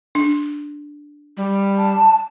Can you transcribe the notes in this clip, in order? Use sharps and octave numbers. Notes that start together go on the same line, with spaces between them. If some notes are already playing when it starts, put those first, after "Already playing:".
D4
G3
A5